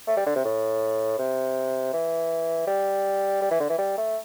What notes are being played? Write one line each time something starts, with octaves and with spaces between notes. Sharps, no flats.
A3
G3
D3
C3
A2
C3
E3
G3
G3
E3
D3
E3
G3
A3